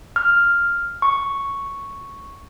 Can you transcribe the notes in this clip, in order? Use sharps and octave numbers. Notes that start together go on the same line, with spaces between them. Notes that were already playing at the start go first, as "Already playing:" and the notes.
F6
C#6